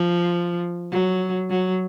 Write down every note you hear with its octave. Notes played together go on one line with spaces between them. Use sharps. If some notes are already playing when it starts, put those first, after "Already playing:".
Already playing: F3
F#3
F#3